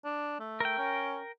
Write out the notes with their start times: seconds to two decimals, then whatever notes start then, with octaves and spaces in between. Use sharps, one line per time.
0.05 D4
0.40 A3
0.60 A#4 G5
0.78 C#4